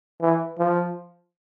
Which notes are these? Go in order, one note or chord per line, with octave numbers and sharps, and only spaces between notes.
E3
F3